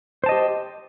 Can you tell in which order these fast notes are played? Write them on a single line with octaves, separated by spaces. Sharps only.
C5 A5 D#5 G4